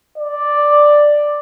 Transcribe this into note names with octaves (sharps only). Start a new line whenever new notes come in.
D5